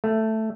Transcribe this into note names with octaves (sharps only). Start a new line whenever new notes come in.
A3